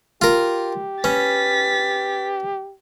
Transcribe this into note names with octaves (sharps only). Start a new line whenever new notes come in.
F4 G4 A#4
C#4 B4 A6 B6